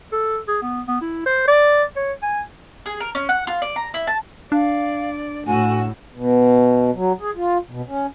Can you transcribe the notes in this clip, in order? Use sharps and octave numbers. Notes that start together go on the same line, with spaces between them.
A4
G#4
B3
B3
E4
C5
D5
C#5
G#5
G#4
A#4
C#4
F#5
F4
D5
A#5
E4
A5
D4 D5 F5
A2 F#4 G#5 E6
B2
F#3
G#4
F4
B2
C#4